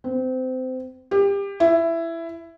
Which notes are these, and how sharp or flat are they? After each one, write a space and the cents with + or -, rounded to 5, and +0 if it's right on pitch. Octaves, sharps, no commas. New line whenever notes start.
C4 -25
G4 +25
E4 +15